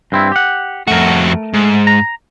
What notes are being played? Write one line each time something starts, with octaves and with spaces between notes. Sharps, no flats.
G2 C4 E4
G4 F#5
F2 A3 F#4 A#4
G#2
A#5